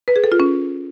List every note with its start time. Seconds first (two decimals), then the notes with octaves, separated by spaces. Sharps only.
0.08 B4
0.16 G#4
0.24 A4
0.32 F4
0.40 C#4